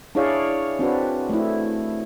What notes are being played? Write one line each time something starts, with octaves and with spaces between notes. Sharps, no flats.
D4 E4 G#4 C#5 D5 F5
C4 D4 F#4 B4
A3 E4